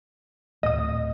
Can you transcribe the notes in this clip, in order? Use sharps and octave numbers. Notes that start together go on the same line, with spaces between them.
D1 A2 D#5 D#6